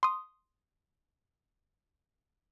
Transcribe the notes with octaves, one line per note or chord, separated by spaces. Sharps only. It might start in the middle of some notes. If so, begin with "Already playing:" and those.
C6 D#6